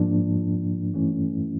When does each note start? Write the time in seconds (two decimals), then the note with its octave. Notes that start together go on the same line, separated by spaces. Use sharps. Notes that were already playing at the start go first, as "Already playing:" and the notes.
Already playing: G#2 F3 A#3 D4
0.94 G2 E3 A3 C#4 E4